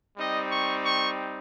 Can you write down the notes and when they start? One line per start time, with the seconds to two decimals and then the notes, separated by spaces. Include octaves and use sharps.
0.16 G3 C4 D#4 D#5
0.50 C#6
0.83 C#6